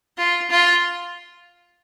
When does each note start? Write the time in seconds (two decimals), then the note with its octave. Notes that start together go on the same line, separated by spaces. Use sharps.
0.18 F4
0.51 F4